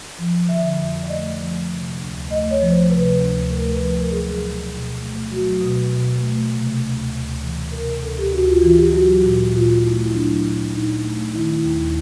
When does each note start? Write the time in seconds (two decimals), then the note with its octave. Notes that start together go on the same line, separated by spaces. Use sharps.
0.19 F3
0.49 D3 E5
0.80 F2
1.03 D5
1.09 A3 D#5
1.40 F3
1.69 C3
2.00 D2
2.30 A3 D#5
2.51 C#5
2.60 F3
2.71 C5
2.90 C3 B4
3.20 D2
3.50 A3 A#4
3.66 B4
3.80 F3 B4
3.95 A#4
4.11 F#3 G#4
4.41 B2
4.72 B2
5.01 A3
5.31 F#3 F#4
5.61 B2
5.92 B2
6.21 A3
6.52 C3
6.81 D2
7.12 D2
7.42 E3
7.72 C3 A#4
8.02 D2 A4
8.18 G4
8.32 D2 F#4
8.47 F4
8.62 E3 F4
8.77 G4
8.93 F#3 F#4
9.23 A#2
9.53 A#2 F4
9.68 F4
9.83 A3 E4
9.99 E4
10.13 F#3 D4
10.43 A#2
10.73 A#2 D#4
11.04 A3
11.34 D#3 E4
11.64 D#2